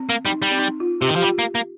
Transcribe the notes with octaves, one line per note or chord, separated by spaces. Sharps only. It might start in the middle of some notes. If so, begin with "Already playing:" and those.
Already playing: C4
A#3
G3 D#4
G3
C4
D#4
F4
C3 G4
D#3
F3 G4
G3 F4
A#3
A#3